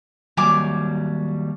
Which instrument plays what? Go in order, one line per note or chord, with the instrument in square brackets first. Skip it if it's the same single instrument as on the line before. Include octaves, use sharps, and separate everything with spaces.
[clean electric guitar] D#2 F#3 G3 [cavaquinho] G#5 D6